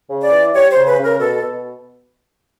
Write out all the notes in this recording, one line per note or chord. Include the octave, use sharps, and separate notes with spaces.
C#3
D5
E3
G3 C#5
C5
C#3
B4
C#3
A#4
B2 A4
B2